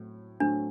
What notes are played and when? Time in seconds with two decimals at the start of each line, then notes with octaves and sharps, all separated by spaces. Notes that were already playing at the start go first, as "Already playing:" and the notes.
Already playing: A2 F#3 A3 C4
0.40 A2 F#3 A3 C4 D4